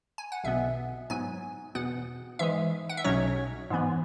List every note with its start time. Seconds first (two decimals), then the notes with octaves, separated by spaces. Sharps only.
0.18 G#5
0.32 F#5
0.44 B1 B2 B3 E5
1.10 G#2 F#3 B3 G#5
1.75 E2 B2 B3 F#5
2.39 G#2 E3 G#3 E5
2.89 F#5
2.97 E5
3.04 B1 B2 F#3 C#4 C#5
3.70 G#2 E3 B3